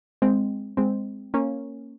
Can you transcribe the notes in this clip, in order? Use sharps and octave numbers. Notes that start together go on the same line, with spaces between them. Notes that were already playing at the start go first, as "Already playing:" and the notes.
G#3 C4
G#3 C4
A#3 C#4